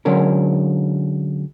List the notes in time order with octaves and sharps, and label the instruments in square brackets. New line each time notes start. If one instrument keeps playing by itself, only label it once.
[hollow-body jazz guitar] D3 F#3 G#3 C#4 A#4